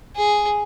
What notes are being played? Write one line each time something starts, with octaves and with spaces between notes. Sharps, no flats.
G#4